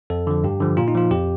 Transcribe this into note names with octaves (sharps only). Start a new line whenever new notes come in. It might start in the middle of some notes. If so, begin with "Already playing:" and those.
F2 A4
D3 F3
G2 G4
D3 F3
A#2 F4
D#4
F3 F4
F2 G4